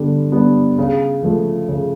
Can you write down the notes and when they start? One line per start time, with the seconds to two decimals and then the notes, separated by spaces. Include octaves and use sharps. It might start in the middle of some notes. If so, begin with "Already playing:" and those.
Already playing: D3 G3 B3 D4
0.32 G3 B3 D4
0.78 C#3
1.23 F3 A3
1.68 C#3